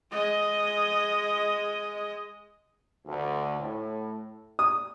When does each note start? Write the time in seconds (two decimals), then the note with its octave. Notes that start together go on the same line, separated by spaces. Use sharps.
0.11 G#3 D#5
3.06 D2
3.60 A2
4.59 D#6